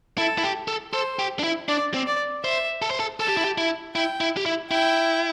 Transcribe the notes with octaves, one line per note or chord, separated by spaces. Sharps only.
E4 A4
E4
G4
A4
A4 C5
G4
D4
E4
D4 D5
C4
D5
C5 E5
A4
C5
A4
A4 A5
G4
E4
G4
E4
E4 G5
E4
G4
E4
E4 G5